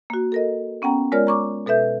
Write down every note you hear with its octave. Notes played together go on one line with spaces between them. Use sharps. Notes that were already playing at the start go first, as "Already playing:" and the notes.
A#3 F#4
A4 A#4 D#5
B3 C#4 F#5 G5 A#5
G#3 F4 A#4 C#5 D5 F6
A#5 C#6 D6
B2 A4 B4 E5 G6